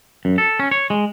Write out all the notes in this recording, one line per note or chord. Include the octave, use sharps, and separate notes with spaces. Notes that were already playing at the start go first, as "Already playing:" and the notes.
F#2
A4
C#4
C#5
G#3